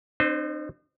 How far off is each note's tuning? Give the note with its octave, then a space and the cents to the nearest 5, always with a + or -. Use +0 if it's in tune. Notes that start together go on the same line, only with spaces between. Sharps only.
C4 +30 D#4 -40 C5 -25